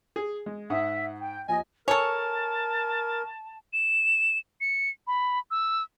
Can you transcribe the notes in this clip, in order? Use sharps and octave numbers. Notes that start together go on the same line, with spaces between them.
G#4
G#3
G#2 E5 F#5 D#6
G5
D#2 F3 D#5 G#5
A4 A#4 C#5 G#5 A5 C#6
E7
C#7
B5
E6